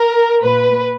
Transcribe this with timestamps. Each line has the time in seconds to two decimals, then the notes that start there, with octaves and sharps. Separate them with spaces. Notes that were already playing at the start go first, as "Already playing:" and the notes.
Already playing: A#4
0.42 A#2 B4